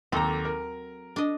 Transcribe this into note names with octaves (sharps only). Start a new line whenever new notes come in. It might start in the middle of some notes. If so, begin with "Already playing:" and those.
D#2 F#3 C4 A4 A#5
A#4
D4 D#5